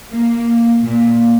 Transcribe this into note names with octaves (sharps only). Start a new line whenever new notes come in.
A#3
A#2